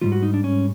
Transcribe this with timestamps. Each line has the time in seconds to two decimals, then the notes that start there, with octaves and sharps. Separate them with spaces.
0.01 G#2 D#3 G3 F4
0.12 F#4
0.23 D#4
0.34 D4
0.44 C#4